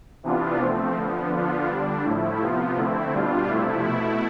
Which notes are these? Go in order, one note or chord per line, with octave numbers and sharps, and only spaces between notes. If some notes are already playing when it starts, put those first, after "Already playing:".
C3 E3 B3 D4 F4
F3 A3 C4
D3 F3 B3
D3 F3 B3 D4 F4
D3 G3 D4
A2 F3 A3 E4
C3 F3 B3 F4
D3 A3 C4 E4
B2 G3 D4 F4
C3 F3 A3 E4
B2 A3 E4